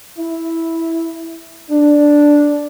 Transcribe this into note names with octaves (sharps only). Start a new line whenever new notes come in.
E4
D4